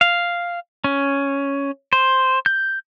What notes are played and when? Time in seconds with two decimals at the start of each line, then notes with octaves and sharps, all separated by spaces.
0.01 F5
0.84 C#4
1.93 C5
2.46 G6